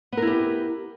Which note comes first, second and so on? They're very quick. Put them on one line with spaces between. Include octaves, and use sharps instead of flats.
B3 A#4 E4 G4